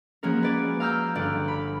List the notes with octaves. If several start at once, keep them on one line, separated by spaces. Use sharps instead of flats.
F3 G#3 A#3 C#4 F#4 A#4
B4 D5 G#5
F5 A#5 E6 F6 G6
G1 D5 F#6
B5